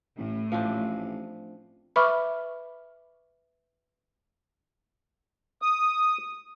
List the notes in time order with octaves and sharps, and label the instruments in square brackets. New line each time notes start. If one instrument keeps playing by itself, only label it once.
[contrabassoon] A1 [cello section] A2
[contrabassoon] A1 [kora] F3 C4 D4
[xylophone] B4 E5 F6 [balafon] B5 C#6 D6
[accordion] D#6